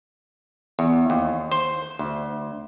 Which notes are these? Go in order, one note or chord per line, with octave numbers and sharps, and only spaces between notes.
E2
D#2
C5
D2